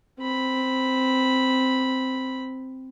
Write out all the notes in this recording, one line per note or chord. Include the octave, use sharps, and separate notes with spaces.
C4 B5